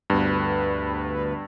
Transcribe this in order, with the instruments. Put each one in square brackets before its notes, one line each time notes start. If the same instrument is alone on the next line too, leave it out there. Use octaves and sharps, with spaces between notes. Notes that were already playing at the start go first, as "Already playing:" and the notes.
[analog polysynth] D2 B4 [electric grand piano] G2 B3